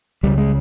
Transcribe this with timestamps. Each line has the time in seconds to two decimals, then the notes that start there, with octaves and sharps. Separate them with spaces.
0.23 C#2 C#3 G3
0.38 G#3